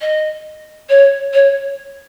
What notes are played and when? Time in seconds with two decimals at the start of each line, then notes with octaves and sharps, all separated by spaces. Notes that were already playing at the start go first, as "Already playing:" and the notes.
0.01 D#5
0.89 C#5
1.33 C#5